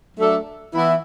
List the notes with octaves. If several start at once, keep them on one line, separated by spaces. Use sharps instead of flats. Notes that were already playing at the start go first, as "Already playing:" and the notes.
F#3 A3 D4 A4 E5
E3 B3 E4